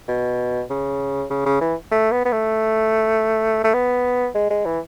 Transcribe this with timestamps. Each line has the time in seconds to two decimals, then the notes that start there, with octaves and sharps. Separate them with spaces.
0.08 B2
0.70 C#3
1.30 C#3
1.46 C#3
1.61 E3
1.92 A3
2.12 B3
2.25 B3
2.32 A3
3.64 A3
3.74 B3
4.35 G#3
4.50 G#3
4.66 E3